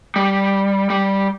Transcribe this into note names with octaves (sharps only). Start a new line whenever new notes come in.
G3
G3